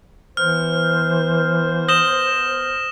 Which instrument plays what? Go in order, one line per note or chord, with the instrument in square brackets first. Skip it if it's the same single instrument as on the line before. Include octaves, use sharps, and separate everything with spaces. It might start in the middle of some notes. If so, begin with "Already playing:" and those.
[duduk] E3 [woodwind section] B3 C5 [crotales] F6
[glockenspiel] D#6 F#7 G7 [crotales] A#6 E7